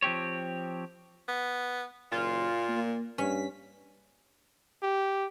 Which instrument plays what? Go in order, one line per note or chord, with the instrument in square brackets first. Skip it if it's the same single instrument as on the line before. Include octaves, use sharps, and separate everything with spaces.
[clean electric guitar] F3 C4 G4 C#5
[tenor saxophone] B3
[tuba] F#1 [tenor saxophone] A#2 [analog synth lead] F4
[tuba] A#3
[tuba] G2 [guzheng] C#4 [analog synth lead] B6
[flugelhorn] G4